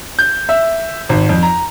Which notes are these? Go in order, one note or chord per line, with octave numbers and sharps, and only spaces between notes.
G6
E5
G#1
F2
A#5